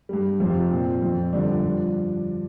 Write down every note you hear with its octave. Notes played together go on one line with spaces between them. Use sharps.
G2 G3
F2 C3 F3 C4 F4
A#2 F3 C4
F2 F3
G2 D3 F3 D4
G2 F3